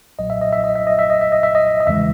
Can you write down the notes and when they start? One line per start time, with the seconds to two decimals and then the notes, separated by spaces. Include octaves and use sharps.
0.19 B1 A#2 F#3 D#5
0.30 E5
0.41 D#5
0.53 E5
0.64 D#5
0.76 E5
0.87 D#5
0.99 E5
1.10 D#5
1.21 E5
1.32 D#5
1.43 E5
1.55 D#5
1.80 D#5
1.87 E2 C#3 E3 G#3 E5